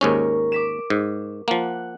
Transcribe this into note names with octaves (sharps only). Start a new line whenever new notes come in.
D#2 G#2 C#4 A#4 C#6
D6 B6 E7
G#2
F3 A#3 F#5